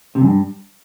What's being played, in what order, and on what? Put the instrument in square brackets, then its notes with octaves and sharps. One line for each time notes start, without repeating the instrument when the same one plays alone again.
[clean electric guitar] C3
F#2
G2